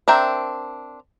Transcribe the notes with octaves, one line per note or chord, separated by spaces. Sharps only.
C4 D4 A#4 E5 G5